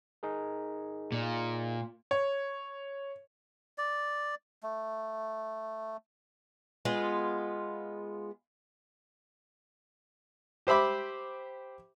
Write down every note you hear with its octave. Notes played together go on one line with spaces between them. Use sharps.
D#4 G#4 A#4
A#2
C#5
D5
A3
G#3 B3 F4
G4 C5 E5 B5 D6